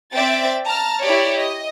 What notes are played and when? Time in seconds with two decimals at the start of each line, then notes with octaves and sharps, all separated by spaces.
0.13 C4 D5 E5 G5 A6
0.65 A5 A#5 F6
1.03 E4 G4 C#5 D5
1.36 D#5